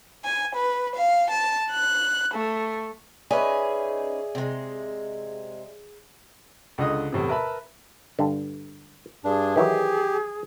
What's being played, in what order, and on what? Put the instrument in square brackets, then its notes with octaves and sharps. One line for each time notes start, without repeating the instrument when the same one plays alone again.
[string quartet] G#5
B4
F5
A5
F#6
A3
[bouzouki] C#4 D#4 B4 [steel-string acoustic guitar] G#4 [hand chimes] D5 E5
[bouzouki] C3 G#3
[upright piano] C#2 D3 D#5 D#6
E2 A2 C3
A#4 B4 E5 A5 B5
[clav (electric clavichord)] G2 D3
[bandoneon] G2 D4 [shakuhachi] G#4
[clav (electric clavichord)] D#3 E3 F#3 [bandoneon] G4